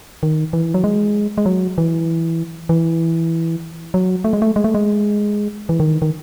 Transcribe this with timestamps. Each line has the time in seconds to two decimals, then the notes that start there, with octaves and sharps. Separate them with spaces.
0.23 D#3
0.53 E3
0.74 F#3
0.84 G#3
1.38 G#3
1.46 F#3
1.78 E3
2.69 E3
3.94 F#3
4.24 A3
4.33 G#3
4.42 A3
4.56 G#3
4.64 A3
4.75 G#3
5.69 E3
5.80 D#3
6.02 D#3